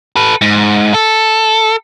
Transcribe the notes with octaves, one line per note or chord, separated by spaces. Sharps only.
A4 B4
G#2
A4